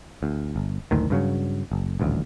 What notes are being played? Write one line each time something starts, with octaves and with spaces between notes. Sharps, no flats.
D2
G1
F#1 D2 A2 D#3
G2 C#3 F#3
F#1
D#1 A1 D2